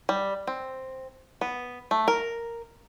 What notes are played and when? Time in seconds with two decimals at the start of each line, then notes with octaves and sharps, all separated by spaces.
0.09 G3
0.47 C4
1.41 B3
1.91 A3
2.08 A#4